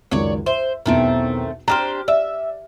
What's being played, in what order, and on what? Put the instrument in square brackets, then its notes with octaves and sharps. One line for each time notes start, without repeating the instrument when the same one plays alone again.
[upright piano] C#2 F#2 D#3 [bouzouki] C#5 D5
[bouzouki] C5 [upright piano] E5
[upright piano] B1 E2 B2 [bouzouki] D#3 A3 C4
[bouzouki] D4 G4 C5 [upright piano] A#5 F6
[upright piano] D5 [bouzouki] E5